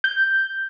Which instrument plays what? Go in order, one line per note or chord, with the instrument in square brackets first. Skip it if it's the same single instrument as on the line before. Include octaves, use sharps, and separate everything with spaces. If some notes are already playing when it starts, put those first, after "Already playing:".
[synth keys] G6